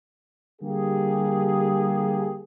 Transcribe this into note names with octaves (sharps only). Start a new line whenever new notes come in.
D3 G3 A#3 G4 G#4